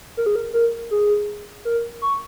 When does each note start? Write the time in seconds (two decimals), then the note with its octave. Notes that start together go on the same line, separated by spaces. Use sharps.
0.17 A#4
0.26 G#4
0.36 A#4
0.53 A#4
0.91 G#4
1.65 A#4
2.02 C#6